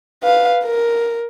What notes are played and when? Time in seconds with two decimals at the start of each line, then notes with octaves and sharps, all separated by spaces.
0.23 B4 F5
0.64 A#4